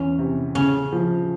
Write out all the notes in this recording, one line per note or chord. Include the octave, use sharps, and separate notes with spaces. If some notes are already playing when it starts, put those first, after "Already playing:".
Already playing: E2 C#4
C3
C#3 C#4
F3